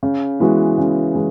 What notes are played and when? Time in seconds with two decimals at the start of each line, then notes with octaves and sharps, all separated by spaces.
0.03 C#3
0.40 E3 G#3 B3 F#4
0.78 C#3
1.15 E3 G#3